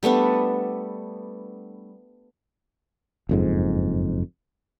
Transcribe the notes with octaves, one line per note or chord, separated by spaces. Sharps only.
G3 A3 B3 D4
F#1 F2 G#2